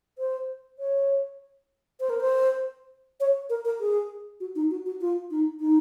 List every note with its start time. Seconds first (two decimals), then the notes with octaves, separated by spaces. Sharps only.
0.18 C5
0.79 C#5
2.00 C5
2.10 A#4
2.20 C5
3.20 C#5
3.50 A#4
3.65 A#4
3.80 G#4
4.40 F#4
4.56 D#4
4.71 F#4
4.86 F#4
5.01 F4
5.31 D#4
5.60 D#4